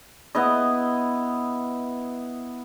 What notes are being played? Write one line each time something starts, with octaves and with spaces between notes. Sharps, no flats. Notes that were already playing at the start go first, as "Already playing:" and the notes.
B3 E4 D#5